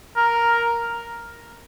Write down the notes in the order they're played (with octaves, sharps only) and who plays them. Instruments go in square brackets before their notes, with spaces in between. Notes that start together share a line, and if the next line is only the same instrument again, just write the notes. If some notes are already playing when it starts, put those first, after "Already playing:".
[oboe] A#4